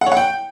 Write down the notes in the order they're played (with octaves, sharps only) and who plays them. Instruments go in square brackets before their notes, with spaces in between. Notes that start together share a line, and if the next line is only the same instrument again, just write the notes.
[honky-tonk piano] F#5
C#5
F#5
G5